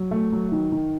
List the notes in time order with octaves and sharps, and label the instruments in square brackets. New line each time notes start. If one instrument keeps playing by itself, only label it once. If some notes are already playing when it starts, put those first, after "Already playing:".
Already playing: [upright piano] F#3
A3
F#3
D#3
D#3